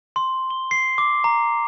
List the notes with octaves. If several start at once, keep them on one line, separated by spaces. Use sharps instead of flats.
C6
G7
C7
D6
A#5